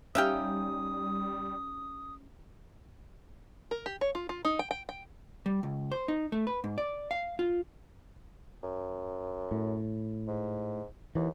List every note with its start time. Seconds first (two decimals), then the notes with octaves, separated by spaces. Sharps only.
0.15 G3 C#4 D#4 G4 E5 F5 G5 D#6
3.71 A#4
3.86 G4
4.01 C#5
4.15 F4
4.29 F4
4.45 D#4
4.59 G5
4.71 G5
4.89 G5
5.46 G3
5.63 C#2
5.92 C5
6.08 D#4
6.32 A3
6.47 B4
6.64 G#2
6.78 D5
7.11 F5
7.39 F4
8.63 F#2
9.51 A2
10.28 G#2
11.15 D#2 E3